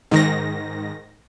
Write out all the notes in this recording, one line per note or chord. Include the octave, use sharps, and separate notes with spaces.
G#2 D#3 A#6